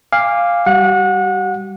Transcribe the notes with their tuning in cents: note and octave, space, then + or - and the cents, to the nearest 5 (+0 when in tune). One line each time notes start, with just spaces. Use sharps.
F5 +0 G#5 -35 D6 +0
G3 +0 G4 -45 F#5 -30